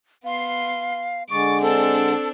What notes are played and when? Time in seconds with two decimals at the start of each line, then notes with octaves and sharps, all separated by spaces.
0.24 B3 F5 C6
1.30 D3 G#3 C#6 D6 A6
1.62 C4 D4 A4